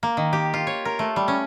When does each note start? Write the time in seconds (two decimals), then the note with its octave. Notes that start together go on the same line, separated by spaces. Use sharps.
0.03 A#3
0.17 D#3
0.33 G4
0.54 F4
0.67 C#5
0.85 A#4
0.99 A3
1.16 G3
1.28 C#4